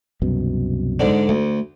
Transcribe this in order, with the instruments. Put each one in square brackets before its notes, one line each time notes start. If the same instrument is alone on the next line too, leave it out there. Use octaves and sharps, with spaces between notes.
[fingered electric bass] C2 F#2 B2
[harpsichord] G#2 D3 D4
[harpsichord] D2 [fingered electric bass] A3